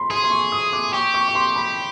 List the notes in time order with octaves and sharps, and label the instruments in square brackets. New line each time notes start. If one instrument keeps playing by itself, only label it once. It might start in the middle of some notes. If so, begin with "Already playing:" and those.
Already playing: [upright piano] B5 C6
[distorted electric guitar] G#4 [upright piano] C6
[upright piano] C6
C#6
D#6
D6
[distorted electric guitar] G4 [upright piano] C#6
[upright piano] C#6
C#6
C6
B5